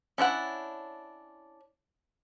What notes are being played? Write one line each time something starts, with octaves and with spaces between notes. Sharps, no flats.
C#4 D4 E4 F#5